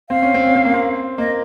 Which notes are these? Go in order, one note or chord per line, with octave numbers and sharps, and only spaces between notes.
C4 F5
C#4
C4
C#4
C4
A#3
C4
A#3 D#5